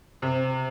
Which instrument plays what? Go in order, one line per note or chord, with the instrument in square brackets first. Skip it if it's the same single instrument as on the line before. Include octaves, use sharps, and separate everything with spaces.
[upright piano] C3